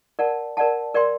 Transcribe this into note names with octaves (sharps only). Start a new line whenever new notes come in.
A#4 D5 F#5 A5
A#4 D5 F#5 A5
A#4 D5 G5 C6